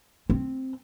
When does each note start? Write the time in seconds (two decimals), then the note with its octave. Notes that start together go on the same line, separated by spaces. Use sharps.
0.30 C4